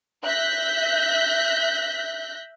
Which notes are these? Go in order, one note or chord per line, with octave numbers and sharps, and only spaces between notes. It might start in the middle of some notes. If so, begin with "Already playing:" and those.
E5 F#6 G6 A#6 B6